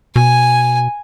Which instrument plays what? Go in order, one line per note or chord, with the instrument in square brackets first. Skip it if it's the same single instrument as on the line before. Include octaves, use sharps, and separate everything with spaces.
[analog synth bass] B2 [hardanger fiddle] G#5